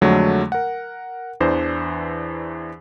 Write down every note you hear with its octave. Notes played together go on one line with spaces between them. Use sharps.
F2 D3 F#3 G#3 A3
A#4 F#5
E2 E3 D4 C5